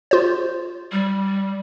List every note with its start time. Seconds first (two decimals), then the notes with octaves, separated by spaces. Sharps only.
0.11 F4 C5
0.92 G3